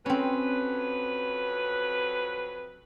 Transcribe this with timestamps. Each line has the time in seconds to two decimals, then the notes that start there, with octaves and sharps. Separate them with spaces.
0.06 F2 F#3 C4 C#4 B4